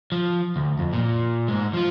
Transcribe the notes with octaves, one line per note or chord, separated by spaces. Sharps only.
F3
D2
F2
A#2
G#2 G#3
F3 F4